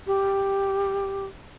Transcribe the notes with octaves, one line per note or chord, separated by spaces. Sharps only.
G4